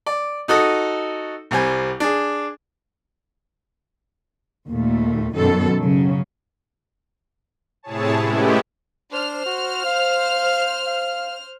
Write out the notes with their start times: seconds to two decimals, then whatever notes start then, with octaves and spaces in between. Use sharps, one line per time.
0.06 D5
0.48 D#4 F#4 A4 D#6
1.51 C2 G3 C4 G#5
2.00 D4 G#4
4.67 D#2 A#2 A3
5.35 F#2 B2 D#3 A4
5.78 C#3 F#3
7.83 A2 C3 E4 G#4 C#5 A5
8.20 G#3 A3 B3 C#4 E4 G4
9.12 D4 C5 F6
9.46 F#4
9.85 F5
10.87 F5